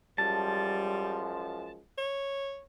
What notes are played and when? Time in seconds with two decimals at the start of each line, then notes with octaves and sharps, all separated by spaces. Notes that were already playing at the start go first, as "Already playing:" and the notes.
0.18 F#2 F3 G3 G#3 A5
1.98 C#5